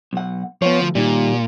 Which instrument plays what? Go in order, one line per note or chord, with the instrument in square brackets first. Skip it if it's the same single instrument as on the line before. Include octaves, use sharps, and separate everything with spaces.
[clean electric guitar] B1 F#5
[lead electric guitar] F3 [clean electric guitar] B3 C#5
[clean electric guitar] D2
[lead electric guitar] A#2 [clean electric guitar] D#3 G3